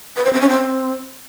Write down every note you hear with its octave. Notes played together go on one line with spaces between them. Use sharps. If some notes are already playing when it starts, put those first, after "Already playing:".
B4
C5
C4
C#4
C4